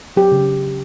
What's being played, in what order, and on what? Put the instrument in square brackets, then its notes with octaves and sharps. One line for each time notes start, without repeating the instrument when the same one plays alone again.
[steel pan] F#3 G4
C#3